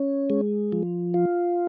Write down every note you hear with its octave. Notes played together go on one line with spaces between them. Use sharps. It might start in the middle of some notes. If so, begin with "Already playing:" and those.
Already playing: C#4
G#3
F3
F4